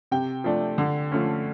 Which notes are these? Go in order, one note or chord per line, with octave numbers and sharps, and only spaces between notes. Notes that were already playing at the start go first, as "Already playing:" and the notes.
C3 G5
F3 A3 D4
D3
F3 A3 C#4